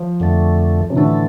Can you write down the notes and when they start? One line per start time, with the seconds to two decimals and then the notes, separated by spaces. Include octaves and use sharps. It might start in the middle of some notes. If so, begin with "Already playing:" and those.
Already playing: F3
0.20 F2 D3 A3
0.90 C3
0.96 A2 D3 E3 A3